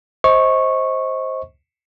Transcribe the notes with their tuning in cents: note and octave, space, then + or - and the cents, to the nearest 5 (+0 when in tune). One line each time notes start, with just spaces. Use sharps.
C5 +10 D#5 +30 C#6 -10